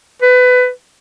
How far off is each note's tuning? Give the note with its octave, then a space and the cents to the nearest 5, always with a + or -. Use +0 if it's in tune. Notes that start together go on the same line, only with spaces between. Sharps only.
B4 +20